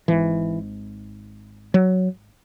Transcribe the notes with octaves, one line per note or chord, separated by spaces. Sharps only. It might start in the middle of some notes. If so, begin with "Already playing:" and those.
G#1 G#2 E3
F#3